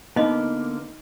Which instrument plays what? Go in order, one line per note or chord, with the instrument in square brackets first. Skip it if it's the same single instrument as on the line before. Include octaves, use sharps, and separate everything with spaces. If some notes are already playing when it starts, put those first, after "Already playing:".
[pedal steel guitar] D3 A#3 [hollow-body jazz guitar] B3 [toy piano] D#4 D#5